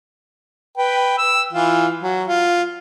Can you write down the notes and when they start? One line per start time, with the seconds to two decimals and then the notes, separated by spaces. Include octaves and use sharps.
0.78 B4 G5
1.18 E6
1.53 E3 F4
2.03 F#3
2.27 F4